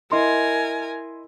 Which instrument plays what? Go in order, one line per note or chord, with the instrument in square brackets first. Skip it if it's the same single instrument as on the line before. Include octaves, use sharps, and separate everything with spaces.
[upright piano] E4 D#5 C6 [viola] A#4 G#5